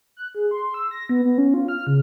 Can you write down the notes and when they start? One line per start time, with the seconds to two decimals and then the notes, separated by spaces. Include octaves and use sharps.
0.17 F#6
0.35 G#4
0.51 C6
0.74 E6
0.91 A#6
1.09 B3
1.25 B3
1.38 C#4
1.54 F4
1.68 F6
1.87 C#3